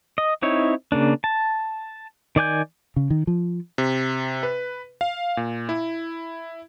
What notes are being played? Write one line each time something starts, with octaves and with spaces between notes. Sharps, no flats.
D#5
C4 D#4 E4 C#5
C#3 A#3 D4
A5
D#3 D5 G#5 G6
C#3
D#3
F3
C3
B4
F5
A#2
E4